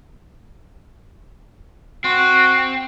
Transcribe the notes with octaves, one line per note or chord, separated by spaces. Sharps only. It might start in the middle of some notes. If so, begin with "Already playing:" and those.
C4 F#4